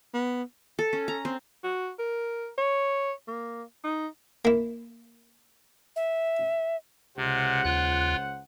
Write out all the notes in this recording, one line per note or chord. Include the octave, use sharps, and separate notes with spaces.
B3
A4
C#4
A#5
C4
F#4
A#4
C#5
A#3
D#4
A#3 E4
E5
C#2 C3 C5 F#5
D#2 F4 F#6